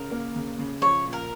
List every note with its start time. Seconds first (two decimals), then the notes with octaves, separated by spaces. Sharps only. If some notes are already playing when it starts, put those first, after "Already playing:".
Already playing: C#3 A#4
0.11 A#3
0.36 C#3
0.59 C#3
0.81 F3 C#5
1.05 A#2
1.13 A#4